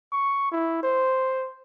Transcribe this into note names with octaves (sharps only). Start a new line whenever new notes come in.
C#6
E4
C5